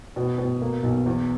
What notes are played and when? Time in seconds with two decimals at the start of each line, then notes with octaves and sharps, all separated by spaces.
0.16 B2
0.38 B2
0.62 A#3
0.83 B1
1.06 E2